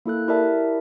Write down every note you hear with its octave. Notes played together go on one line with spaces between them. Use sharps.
A#3 E4 A4 F#6
E4 G4 A#4 D5 E5 A5